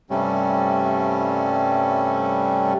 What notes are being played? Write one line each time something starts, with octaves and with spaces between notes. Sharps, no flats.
G2 C3 G3 A3 C#4